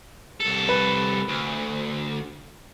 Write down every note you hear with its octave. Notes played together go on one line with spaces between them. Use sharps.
C2 A4
B4
D2